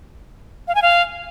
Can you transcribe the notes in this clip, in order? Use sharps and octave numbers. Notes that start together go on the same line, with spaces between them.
F5
G#5
F5